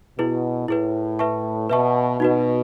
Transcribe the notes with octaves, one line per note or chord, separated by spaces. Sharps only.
B2 E4 G#4 B4
A2 E4 G#4 B4
B4 E5 A5 C#6
B2 B4 E5 A5 C#6
B2 D#4 F#4 B4